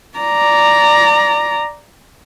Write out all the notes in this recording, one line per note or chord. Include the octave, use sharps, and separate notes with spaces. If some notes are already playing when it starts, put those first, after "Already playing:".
D5 A#5